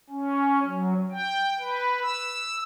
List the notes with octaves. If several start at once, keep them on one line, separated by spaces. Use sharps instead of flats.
C#4
F#3
G5
B4
E6